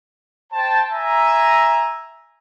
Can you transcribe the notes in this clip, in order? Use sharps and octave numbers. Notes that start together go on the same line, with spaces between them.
C5 G5 A5
E5 G#5 A#5